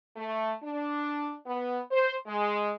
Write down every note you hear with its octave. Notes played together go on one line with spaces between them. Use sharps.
A3
D4
B3
C5
G#3